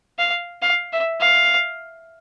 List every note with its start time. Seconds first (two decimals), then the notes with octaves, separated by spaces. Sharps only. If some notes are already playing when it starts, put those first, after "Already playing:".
0.19 F5
0.62 F5
0.93 E5
1.21 F5